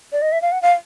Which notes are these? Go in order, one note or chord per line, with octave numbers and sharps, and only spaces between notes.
D5
D#5
E5
F5
F#5
F5